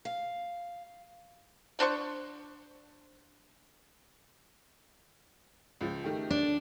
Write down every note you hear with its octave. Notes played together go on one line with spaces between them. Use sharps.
F5
A3 D4 C5 C#6
C#2 F3
D#3 A3 G4
D4